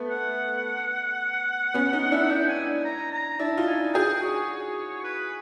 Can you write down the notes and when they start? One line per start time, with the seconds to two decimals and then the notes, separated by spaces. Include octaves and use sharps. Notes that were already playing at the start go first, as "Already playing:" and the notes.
Already playing: A3 B3
0.10 F#5
1.74 B3 C#4
1.93 C#4 D#4
2.11 D4 E4
2.30 D4 E4 G5
2.48 G#5
2.66 G#5
2.85 A#5
3.12 A#5
3.39 D4 E4 A5
3.57 D#4 F4
3.67 G#5
3.94 F#4 G#4 G5
4.22 C#5
5.04 B4